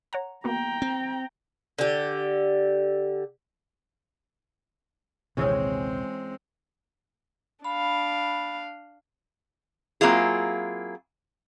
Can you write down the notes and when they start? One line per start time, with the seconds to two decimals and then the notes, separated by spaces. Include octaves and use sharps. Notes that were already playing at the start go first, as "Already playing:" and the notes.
0.13 C#5 F#5 A#5
0.44 A#3 B3 F#4 G5 A#5
0.82 C4
1.78 D3 G4
5.37 A#1 D#2 C3 E3 G#3 C4 C#4 G#4
7.65 D4 F5 B5
10.01 F#3 A#3 C4 E4 F4 G#4